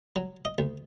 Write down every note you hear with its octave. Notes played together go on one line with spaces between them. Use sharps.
F#3
D#5
D2